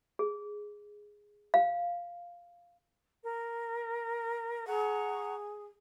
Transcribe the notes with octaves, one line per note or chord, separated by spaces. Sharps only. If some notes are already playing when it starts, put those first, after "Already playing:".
G#4
F5
A#4
G#4 F#5 A#5 C#6